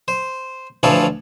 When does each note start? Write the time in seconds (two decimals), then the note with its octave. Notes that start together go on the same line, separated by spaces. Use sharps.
0.08 C5
0.83 D2 E3 F3 A4 C#5 F5